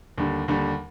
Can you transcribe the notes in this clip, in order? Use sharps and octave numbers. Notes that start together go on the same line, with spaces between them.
D#2 D3 G3
D#2 D3 G3